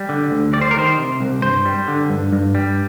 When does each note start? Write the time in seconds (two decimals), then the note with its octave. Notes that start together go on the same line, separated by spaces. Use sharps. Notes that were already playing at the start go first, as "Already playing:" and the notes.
Already playing: G3
0.09 D3
0.31 D2
0.53 G3 D5
0.61 C5
0.71 A#4
0.76 D#3 C5
0.99 C3
1.20 C2
1.42 G2 C5
1.65 G3
1.88 D3
2.10 G2
2.33 G2
2.55 G3